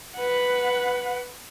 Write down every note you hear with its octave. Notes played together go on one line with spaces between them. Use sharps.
B4 F#5